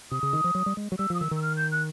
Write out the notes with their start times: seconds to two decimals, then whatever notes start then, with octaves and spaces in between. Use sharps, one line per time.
0.11 C3 D#6
0.23 C#3
0.33 D#3
0.44 F3
0.55 F#3
0.66 G3
0.77 G#3
0.92 F#3
0.99 G3 E6
1.10 F3 D#6
1.20 D#3 E6
1.31 D#3 E6
1.42 F6
1.57 G6
1.72 F#6